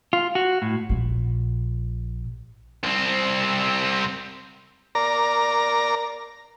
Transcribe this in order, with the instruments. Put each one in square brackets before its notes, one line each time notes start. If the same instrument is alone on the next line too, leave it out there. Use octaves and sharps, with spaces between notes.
[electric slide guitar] F4
F#4
A2
[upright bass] A#1 A#2
[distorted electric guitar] C2 C4
[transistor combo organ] A#4 D5 A#5